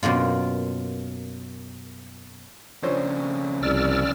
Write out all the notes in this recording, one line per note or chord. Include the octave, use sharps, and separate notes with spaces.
F#2 B2 A#3 F4
F2 C#3 D4 C5 C#5
C2 D5 E6 F6